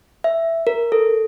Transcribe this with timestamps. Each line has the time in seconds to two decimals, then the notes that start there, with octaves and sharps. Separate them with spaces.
0.24 E5
0.67 A#4
0.92 A4